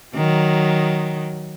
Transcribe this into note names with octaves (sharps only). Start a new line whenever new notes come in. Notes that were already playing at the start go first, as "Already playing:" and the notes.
D#3 F#3